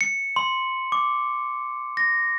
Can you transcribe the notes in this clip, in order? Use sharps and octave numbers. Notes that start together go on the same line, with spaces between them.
C#7
C6
D6
A#6